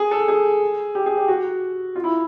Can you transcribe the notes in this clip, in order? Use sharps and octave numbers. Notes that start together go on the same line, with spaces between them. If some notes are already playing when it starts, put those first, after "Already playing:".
Already playing: G#4
A4
G#4
G4
G#4
G4
F#4
F4
E4